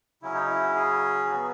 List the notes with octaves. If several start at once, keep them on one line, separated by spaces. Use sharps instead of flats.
C#3 F#3 C#4 E4
D#4
E4
G#4
F#3 B3 F#4